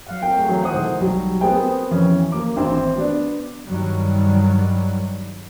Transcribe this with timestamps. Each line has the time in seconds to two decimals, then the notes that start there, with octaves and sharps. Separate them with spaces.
0.07 F#3 F5 F#5
0.22 C4 F#4 A#4 G5
0.37 A3 G#4
0.48 E3 F#3 G#4
0.62 D#3 C5 F#5 D#6
0.74 B2 G#3 A4
1.00 B1 F#3 G3
1.41 B3 C4 G#4 A#4 C5 G5
1.91 F2 E3 C#4
2.32 A#3 D6
2.56 G#1 E3 C4 E4 C5 C6
2.97 B3 D4
3.66 G2 D#3 F#3 G3